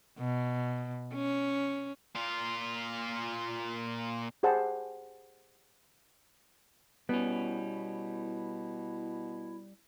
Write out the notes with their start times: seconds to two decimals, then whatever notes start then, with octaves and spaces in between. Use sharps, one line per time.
0.19 B2
1.14 C#4
2.16 A#2 F4
4.43 G4 G#4 C5 F#5 A5 B5
7.09 B2 G3 B3 C#4 E4